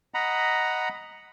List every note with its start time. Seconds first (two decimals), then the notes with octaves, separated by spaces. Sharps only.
0.14 D#5 F#5 A#5 B5